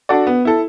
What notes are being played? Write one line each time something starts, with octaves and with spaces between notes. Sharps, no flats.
D4 F#4 A4 D5
B3
E4 A4